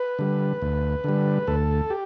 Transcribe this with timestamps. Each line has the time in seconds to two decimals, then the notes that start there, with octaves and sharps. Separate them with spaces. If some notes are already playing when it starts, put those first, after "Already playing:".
Already playing: B4
0.19 D3 G3
0.62 D2
1.04 D3 G3
1.47 D2 A4
1.90 G4